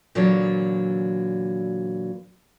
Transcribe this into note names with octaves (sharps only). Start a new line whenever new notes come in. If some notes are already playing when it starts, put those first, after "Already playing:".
A#2 D3 E3 F#3